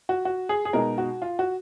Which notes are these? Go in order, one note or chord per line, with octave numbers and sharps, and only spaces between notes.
F#4
F#4
G#4
G#4
B2 G#3 D#4 A#4
F#4
F4
F#4